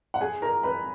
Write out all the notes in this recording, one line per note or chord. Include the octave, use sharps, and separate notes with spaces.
F#5
G#4 G#5
A#4 A#5
B4 B5